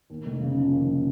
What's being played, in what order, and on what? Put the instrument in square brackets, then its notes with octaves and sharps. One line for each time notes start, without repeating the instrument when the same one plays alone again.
[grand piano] D#2
F1
C#3
F3
D#2